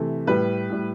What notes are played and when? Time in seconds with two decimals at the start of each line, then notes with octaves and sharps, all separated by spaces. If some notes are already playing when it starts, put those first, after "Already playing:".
Already playing: C3 E3 A3
0.27 A2 G3 B4
0.70 A2 G3